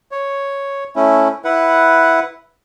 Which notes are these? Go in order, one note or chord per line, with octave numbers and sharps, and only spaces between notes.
C#5
A3 C#4 E4
E4 B4 F#5